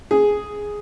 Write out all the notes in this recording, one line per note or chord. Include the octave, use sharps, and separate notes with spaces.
G#4